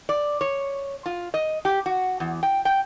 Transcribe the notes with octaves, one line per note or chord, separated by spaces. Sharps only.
D5
C#5
F4
D#5
G4
F#4
E2
G5
G5